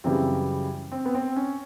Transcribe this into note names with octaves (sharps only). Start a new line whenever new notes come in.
F#2 C#3 E3 G3 C4
C4
B3
C4
C#4